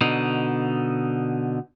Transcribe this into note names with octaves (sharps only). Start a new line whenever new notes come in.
B2 D3 D#4